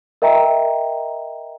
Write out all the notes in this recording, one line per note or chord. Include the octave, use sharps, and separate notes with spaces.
A#4 D#5 E5 G5 A#5